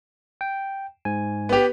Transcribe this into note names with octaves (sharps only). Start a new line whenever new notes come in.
G5
G#2 G#5
B3 G4